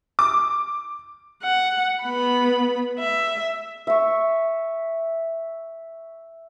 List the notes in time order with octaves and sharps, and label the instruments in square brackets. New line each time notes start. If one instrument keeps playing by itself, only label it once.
[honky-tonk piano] D6
[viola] F#5
B3 B5
E5
[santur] E5 C#6